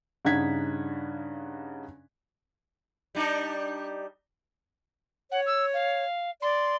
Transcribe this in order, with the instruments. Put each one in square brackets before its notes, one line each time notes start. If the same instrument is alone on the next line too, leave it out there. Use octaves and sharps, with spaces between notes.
[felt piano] G2 C#3 D#4 F#5 G#6 B6
[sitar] G3 D4 D#4
[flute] C#5 [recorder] F#5
[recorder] E6
F5
[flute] D5 [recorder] C6